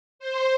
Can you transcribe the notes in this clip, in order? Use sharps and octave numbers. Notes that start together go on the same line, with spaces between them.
C5